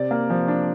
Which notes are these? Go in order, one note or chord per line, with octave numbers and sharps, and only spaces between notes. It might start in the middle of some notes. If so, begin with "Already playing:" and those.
Already playing: C3 D5
A#3
F3
D4